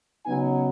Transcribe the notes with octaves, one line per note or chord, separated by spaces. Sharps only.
C#3 F#3 B3 D#4 G#5